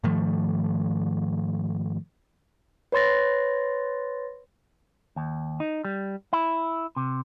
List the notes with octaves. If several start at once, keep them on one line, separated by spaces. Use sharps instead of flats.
G#2 D#3 F3 A3
B4 C#5 C6 A6 A#6
D#2
D#4
G3
E4
C3